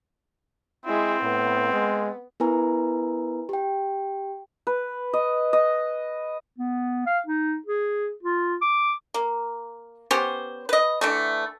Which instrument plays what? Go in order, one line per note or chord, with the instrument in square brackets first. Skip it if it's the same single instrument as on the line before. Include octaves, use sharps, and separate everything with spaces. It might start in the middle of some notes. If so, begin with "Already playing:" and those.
[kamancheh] G#3 E4 [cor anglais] C4
[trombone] A2 [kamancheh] B3
[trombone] G#3
[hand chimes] B3 E4 A#4 B4 G#5 A#5
G4 G5
[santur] B4
D#5
D#5
[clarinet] B3
F5
D#4
G#4
F4
D6
[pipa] A#3
B3 C#4 G4 C5
B4 D#5
D3 E3 A3